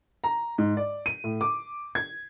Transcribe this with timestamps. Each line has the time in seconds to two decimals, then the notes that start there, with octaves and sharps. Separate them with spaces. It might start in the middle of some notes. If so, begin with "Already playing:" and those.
0.24 A#5
0.58 G#2
0.77 D5
1.06 D#7
1.24 A2
1.41 D6
1.95 G#6